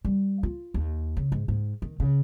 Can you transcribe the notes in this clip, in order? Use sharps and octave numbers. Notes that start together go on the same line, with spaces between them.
G3
F4
D#2
C#3
G#2
G#2
D#3
C#3